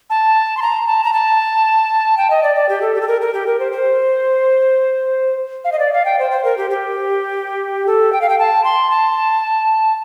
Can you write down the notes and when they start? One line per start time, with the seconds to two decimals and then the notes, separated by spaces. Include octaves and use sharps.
0.10 A5
0.57 C6
0.62 A#5
0.87 A5
1.04 A#5
1.13 A5
2.17 G5
2.30 D#5
2.43 D5
2.56 D5
2.69 G4
2.82 A4
2.95 G4
3.01 A4
3.08 A#4
3.21 A#4
3.34 G4
3.47 A#4
3.59 C5
3.72 C5
5.65 F5
5.72 D#5
5.79 D5
5.93 F5
6.05 G5
6.19 C5
6.31 C5
6.44 A#4
6.57 G4
6.70 G4
7.87 A4
8.13 G5
8.21 F5
8.29 G5
8.39 A5
8.64 C6
8.90 A5